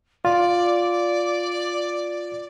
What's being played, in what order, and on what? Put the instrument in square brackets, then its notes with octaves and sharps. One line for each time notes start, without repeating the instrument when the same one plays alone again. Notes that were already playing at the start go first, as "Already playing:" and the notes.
[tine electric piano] F4 [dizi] D5